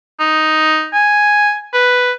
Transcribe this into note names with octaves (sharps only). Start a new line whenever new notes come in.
D#4
G#5
B4